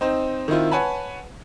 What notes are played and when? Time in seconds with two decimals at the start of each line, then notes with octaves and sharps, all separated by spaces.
0.01 C4 D#4 C5
0.48 D#3 C4 E4 F4
0.71 B4 C#5 F#5 G#5 A5 B5